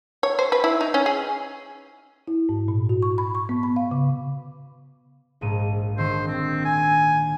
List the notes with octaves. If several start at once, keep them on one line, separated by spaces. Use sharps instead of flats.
C#5
C5
B4
E4
D#4
C#4
G#4
E4
G#2
A#2
F#4
C#6
B5
C#6
B3
B5
F5
C#3
A#1 G#2 D#7
D3 D#3 C5 E6
C4
G#5